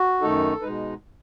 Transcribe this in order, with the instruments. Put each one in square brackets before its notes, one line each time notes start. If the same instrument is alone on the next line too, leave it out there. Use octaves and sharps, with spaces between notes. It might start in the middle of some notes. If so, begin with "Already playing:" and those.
Already playing: [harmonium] F#4
F#2 D#3 A3 D#4 A4
B2 G#3 D#4 B4